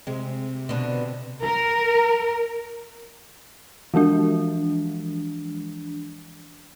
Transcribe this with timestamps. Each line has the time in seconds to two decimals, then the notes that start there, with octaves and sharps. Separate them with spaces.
0.07 C3 G#3
0.69 B2 D3
1.45 A#4
3.94 E3 F3 G#3 D4